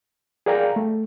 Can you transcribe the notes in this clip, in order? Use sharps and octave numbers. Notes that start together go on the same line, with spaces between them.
G#4 A#4 D5 F5 G5 A#5
A3